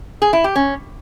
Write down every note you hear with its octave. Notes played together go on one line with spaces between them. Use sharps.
G#4
E4
G4
C#4